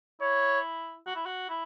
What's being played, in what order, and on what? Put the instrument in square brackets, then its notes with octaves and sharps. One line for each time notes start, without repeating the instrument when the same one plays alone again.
[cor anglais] E4 [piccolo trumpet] C#5
[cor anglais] F#4
E4
F#4
E4